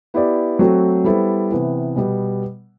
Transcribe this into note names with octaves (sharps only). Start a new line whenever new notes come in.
B3 E4 G4 D5
F#3 A3 C4 F#4
G3 B3 E4 A4 C5
C3 E3 B3
B2 G3 B3